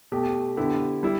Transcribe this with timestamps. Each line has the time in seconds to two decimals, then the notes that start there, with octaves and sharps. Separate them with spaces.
0.12 B2 A3 G4
0.57 D3 B3 E4 G4
1.03 G3 E4